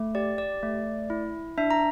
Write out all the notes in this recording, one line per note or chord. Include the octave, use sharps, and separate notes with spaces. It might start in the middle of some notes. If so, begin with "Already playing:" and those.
Already playing: A3
G4 D5
D5
A3
E4
D4 E5
A#5